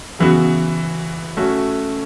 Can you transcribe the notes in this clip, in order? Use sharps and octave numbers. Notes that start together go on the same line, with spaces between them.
C#3 E3 B3 F#4
A3 C#4 F#4